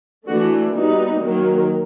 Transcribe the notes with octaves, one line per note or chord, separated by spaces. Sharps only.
E3 A3 D4 F#4
G3 B3 D#4 F#4
D#3 F#3 A#3